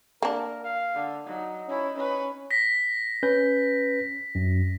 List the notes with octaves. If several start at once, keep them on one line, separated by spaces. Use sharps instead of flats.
A#3 D4 A#4
F5
D3
F#3 D#4
C#4 E4
C#4 B4
A#6 B6
C#4 B4 G6
F#2